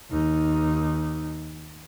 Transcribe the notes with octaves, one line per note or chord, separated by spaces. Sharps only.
D#2 D#4